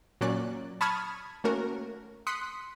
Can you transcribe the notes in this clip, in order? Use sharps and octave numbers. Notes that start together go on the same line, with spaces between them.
A#2 F#3 A#3 C#4 D5 F#6
A5 B5 C#6 D#6 F6 G#6
A3 A#3 C#4 F#4 A#4
C6 D#6 F#6 B6 C#7